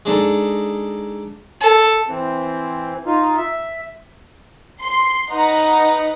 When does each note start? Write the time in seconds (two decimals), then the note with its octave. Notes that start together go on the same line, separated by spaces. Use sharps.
0.05 G#3 D4 D#4 A4
1.61 A4
2.07 E3 C4
3.06 D#4 F4
3.37 E5
4.81 C6
5.30 D#4 B4 F#5 A#5